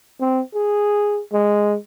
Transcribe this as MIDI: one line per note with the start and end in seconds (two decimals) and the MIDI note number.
0.20 0.41 60
0.55 1.21 68
1.32 1.76 56